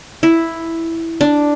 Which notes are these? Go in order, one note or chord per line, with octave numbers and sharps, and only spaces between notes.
E4
D4